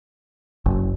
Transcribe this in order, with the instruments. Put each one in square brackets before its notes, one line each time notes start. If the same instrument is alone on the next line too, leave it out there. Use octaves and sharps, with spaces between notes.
[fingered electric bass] F#1